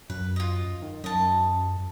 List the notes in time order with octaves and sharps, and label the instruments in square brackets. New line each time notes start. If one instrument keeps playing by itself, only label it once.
[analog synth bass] F#2 [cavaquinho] B4
[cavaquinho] F4 D#5
[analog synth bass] D#3
[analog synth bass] F#2 [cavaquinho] D#5 A5